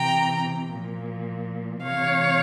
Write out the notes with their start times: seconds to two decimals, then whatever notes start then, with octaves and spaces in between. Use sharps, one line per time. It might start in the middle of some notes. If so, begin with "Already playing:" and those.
Already playing: C3 E3 G5 A#5
0.73 A#2 F3
1.83 C3 E3 C#5 F5